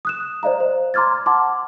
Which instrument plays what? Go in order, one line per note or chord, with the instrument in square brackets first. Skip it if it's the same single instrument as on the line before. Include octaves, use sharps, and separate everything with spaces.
[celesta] D#6 F#6 E7
C5 D5 D#5 F5 A#5
C5
A#5 C6 D6 F6 G#6 A6
F#5 A5 C6 D6